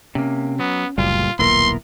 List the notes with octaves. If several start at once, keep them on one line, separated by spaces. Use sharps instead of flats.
C3 A#3 C#4
F#3 B3
F#1 D2 A#2 D3 G3 F4
D#1 B1 A#3 B3 E4 A#4 C6